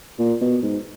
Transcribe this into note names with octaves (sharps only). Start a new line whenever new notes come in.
A#2
B2
G#2